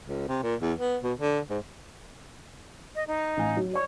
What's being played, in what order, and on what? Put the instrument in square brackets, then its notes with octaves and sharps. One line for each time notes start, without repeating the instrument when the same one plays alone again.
[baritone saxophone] C#2
C3
A#2
E2
B3
B2
D3
G#2
[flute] D#5
D#4
[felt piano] A1 F5 G#5
F#3
[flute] C#5 [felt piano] D5 C#6